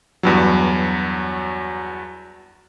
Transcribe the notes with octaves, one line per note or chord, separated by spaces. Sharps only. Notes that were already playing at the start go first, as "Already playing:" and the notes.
E2 G2 F#3